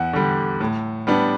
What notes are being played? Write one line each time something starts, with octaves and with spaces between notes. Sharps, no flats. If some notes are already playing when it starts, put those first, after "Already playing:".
Already playing: E2 F#5
D3 G3
A2
G3 B3 D4